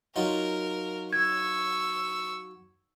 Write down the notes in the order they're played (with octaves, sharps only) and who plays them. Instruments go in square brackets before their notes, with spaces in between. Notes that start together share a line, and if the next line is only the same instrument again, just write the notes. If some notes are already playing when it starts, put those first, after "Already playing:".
[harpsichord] F#3 D#4 F4 [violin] A#4
[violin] C#6 E6 [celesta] G#6